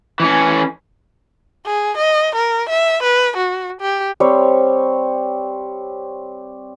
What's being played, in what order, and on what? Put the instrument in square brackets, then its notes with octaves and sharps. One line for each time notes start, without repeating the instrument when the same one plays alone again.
[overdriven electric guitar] E3 C#4
[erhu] G#4
D#5
A#4
E5
B4
F#4
G4
[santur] G3 C4 C#5